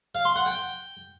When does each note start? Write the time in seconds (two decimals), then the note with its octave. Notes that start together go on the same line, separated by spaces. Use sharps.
0.15 F5
0.25 C6
0.36 F#5
0.46 G5